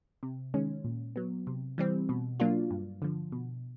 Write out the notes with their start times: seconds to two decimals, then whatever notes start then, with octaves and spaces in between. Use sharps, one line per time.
0.23 C3
0.54 D#3 G#3 C#4
0.84 A#2
1.16 F#3 B3
1.47 C3
1.78 E3 G3 C4
2.09 B2
2.40 F#3 A#3 D4 F4
2.71 G2
3.02 D3 F3
3.32 B2